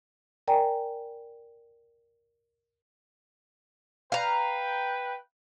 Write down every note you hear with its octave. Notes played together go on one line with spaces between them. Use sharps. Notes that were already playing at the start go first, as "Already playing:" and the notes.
A#4 D5 G5 G#5 A#5
B4 F5 G5 A#5